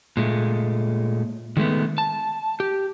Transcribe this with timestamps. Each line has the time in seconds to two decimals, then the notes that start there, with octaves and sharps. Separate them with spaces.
0.17 A#2 G#3 A3
1.57 D#3 G#3 A3 B3
1.98 A5
2.60 G4